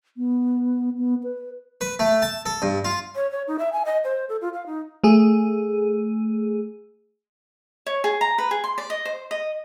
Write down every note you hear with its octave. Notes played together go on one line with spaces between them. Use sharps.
B3
B3
B4
B4
A3
A5
A4
G2
F4
C#5
C#5
D#4
E5
G#5
D#5
C5
A4
F4
F5
D#4
A3 G#4
C#5
G#4
A#5
B4
G#4
C6
D5
D#5
C5
D#5